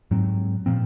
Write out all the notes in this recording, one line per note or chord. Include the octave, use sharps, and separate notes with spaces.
G#2 F#3 C4
A#2 F3 C4